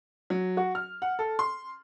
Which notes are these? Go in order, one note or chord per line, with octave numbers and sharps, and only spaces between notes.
F#3
F#4
F6
F#5
A4
C6